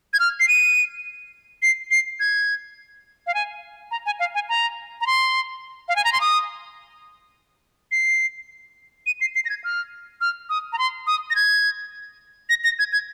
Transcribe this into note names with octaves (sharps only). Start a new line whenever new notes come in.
G#6
F6
C7
D#7
C7
C7
G#6
F5
G#5
A#5
G#5
F5
G#5
A#5
A#5
C6
F5
G#5
A#5
C6
D#6
C7
D#7
C7
C7
A#6
G#6
F6
F6
D#6
A#5
C6
D#6
A#6
G#6
A#6
A#6
G#6
G#6